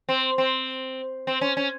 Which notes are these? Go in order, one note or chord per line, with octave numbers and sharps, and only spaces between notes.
C4
C4
C4
C#4
C#4